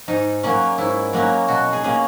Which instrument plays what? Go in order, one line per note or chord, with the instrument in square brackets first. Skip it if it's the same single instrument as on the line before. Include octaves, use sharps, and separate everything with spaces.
[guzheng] G#2 D#4
F#3 A#3 C#4
G#2 E4
F#3 A#3 C#4
B2 F#4
G#4
A#3 C#4 G#4